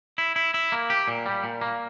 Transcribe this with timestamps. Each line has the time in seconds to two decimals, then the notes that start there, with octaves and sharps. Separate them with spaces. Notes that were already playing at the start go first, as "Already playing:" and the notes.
0.18 E4
0.36 E4
0.54 E4
0.72 A#3
0.90 G4
1.08 A#2
1.26 G3
1.44 A#2
1.61 A#3